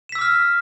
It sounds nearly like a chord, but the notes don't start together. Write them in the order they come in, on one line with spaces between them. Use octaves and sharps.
E7 B6 E6 D6 F6